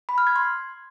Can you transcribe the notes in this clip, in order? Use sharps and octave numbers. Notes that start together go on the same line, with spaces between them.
B5
F6
G#6
C6